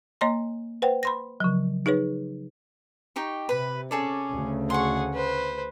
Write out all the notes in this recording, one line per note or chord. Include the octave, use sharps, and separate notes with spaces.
A#3 C#5 D#5 A#5 C6
B4 C5 F#5 G5
B5 C6 A#6
C#3 F3 F#3
D#4 G#4 B4 C#5
D#4 G4 C#6
C3 B4 B5
C#4 G#4 A4 D5
D2 C#3
G#4 F#5 C6 C#6
B4 C5